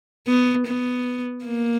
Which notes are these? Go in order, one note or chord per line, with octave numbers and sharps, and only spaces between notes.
B3
B3
A#3